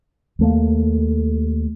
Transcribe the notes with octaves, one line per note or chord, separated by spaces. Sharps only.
D#2 A3 A#3